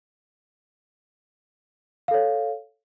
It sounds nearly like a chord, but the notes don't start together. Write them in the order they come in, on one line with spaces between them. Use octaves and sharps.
F5 A4 C#5